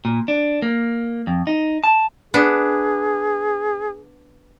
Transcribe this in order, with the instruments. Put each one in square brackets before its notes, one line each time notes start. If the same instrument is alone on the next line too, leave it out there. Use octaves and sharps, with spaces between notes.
[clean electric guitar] A#2
D4
A#3
F2
D#4
A5
[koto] B3 D4 [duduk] G#4